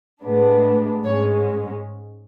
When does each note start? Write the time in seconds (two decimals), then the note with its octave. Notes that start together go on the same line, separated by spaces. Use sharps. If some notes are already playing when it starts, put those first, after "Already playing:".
0.22 A2 G#3 B3 D4
1.03 G#2 G#3 C#4 C#5